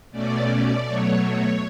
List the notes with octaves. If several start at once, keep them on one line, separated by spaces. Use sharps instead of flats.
B2 A3 C#4 D5
B2 F#3 A3 C#5
C#5